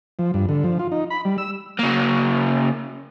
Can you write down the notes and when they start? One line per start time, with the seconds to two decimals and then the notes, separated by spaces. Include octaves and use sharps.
0.19 F3
0.34 G2
0.49 D3
0.64 F3
0.79 F4
0.92 D#4
1.10 B5
1.25 G3
1.38 E6
1.79 C#3 A#3